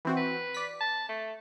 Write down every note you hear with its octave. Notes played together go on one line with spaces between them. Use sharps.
E3 C4 F#4
B4
D5 B6
A5
A3